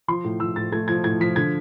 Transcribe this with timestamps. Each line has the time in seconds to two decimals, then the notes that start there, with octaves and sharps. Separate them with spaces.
0.08 F3 C6
0.24 A2
0.40 F3 E6
0.56 A2 A6
0.72 A3 G#6
0.88 F3 G#6
1.04 A2 G#6
1.20 F3 B6
1.36 D3 G#6